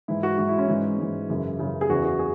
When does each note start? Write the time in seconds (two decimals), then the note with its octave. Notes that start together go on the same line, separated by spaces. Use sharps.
0.08 G#2 E3 E4
0.23 F#4
0.38 G#2 E3 F#4
0.48 E4
0.58 C#4
0.68 G#2 E3
0.99 G#2 E3
1.29 F#2 C#3 E3
1.59 F#2 C#3 E3
1.81 G#4
1.90 E2 C#3 E3 F#4
2.05 F#4
2.19 G#4